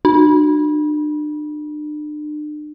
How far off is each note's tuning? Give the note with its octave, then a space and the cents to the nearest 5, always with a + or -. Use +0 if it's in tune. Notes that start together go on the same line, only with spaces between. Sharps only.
D4 +40